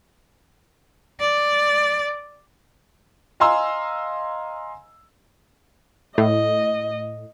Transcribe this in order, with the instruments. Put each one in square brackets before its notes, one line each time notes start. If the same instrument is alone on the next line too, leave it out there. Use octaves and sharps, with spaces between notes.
[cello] D5
[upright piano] D#5 F5 G#5 A#5 C6 E6
[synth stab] A2 [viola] D#5